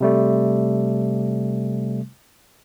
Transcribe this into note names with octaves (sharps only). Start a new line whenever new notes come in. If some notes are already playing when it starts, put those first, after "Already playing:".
C3 G3 A3